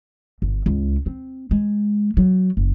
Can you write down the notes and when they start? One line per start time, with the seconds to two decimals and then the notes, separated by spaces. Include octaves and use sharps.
0.42 G1
0.66 C#2
1.06 C4
1.51 G#3
2.17 F#3
2.57 F#1